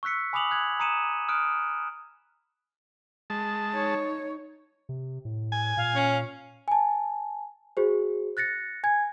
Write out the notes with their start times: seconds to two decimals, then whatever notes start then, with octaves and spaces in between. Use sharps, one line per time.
0.03 C#6 E6 F#6 B6 C#7
0.33 G#5 B5 D6 D#6 F7 F#7
0.51 F#6 G#6 F#7
0.80 A#5 D#6 C#7 D#7 E7
1.28 D#6 F6 F#6 D7
3.30 G#3 A5
3.73 D#4 C#5
4.89 C3
5.25 A2
5.52 G#5
5.77 A#2 F5
5.95 C#4
6.68 G#5 A5
7.77 F#4 G#4 C5
8.37 F#6 A6 A#6 C#7
8.84 G#5 G#6